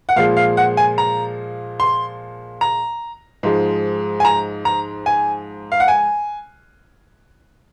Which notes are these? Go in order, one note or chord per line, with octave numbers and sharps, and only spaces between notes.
F#5
A#2 F3 G#3 F5
F5
F#5
G#5
A#5
C6
A#5
G#2 F3 G#3
G#5
A#5
A#5
G#5
F5
F#5
G#5